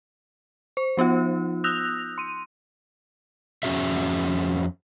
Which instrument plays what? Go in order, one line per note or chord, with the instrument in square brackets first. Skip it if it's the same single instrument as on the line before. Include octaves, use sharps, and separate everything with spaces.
[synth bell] C5
F3 B3 D#4 F4
D#6 E6 F#6 G6 A#6 F7
C6 D#7
[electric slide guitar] F2 C#4 F#4 G#4 E5